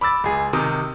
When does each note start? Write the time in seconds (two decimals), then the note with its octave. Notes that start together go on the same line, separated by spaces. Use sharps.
0.01 B5 D6 E6 A6
0.24 C#2 G#4
0.53 C3 D#3 D#4 D#6